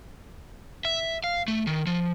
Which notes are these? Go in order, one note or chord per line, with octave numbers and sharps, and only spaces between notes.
E5
F5
A3
D#3
F3